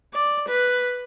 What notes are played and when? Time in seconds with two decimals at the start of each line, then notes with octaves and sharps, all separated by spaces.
0.14 D5
0.49 B4